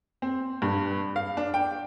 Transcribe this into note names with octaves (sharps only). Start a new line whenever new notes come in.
C4
G2
F5
D4
G5